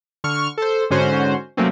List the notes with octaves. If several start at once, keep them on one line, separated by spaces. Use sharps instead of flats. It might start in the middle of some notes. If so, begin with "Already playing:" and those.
D3 C#6 F6
A4 C5
G#2 D3 C#4 F#4 C5
C3 F#3 A3 A#3 C4 C#4